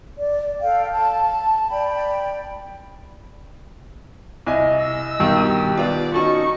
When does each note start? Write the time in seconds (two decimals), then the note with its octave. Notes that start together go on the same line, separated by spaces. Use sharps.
0.17 D5
0.62 A4 F5 G5
0.92 A5
1.70 D5 G5 B5
4.46 C2 D#5 G#5
4.81 E6
5.20 G2 B2 D#3 G4
5.77 B3 F4 D5
6.14 C#4 D#4 F#4 A4 C#6